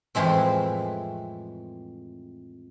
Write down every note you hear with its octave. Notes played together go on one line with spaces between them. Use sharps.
F2 A2 E3 G#3 C4